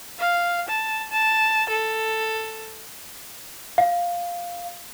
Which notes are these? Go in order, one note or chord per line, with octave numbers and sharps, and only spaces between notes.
F5
A5
A5
A4
F5